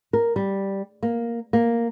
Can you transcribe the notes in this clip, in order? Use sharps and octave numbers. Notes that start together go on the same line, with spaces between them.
A#4
G3
A#3
A#3